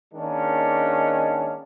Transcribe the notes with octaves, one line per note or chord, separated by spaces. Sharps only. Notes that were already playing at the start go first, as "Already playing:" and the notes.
D#3 G#3 A#3 C#4 D4